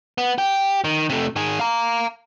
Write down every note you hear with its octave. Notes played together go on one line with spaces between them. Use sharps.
B3
G4
D#3
C3 A3
D#3 G#4
F5 A#5